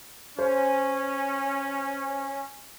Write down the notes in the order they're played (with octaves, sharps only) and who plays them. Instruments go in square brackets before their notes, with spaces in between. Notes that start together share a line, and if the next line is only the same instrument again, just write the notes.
[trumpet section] C#4 [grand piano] C5